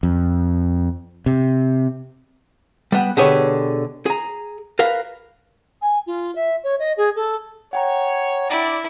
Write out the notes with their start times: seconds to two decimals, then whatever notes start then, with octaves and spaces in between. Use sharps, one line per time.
0.03 F2
1.26 C3
2.92 G3 B3
3.17 B2 D3 G4 G#4 B4 C#5
4.06 G#4 A#5
4.79 A#4 B4 F5
5.81 G#5
6.06 F4
6.35 E5
6.64 C#5
6.79 D#5
6.97 G#4
7.16 A4
7.73 C#5 F#5 G5 A#5
8.49 D4 E4 D5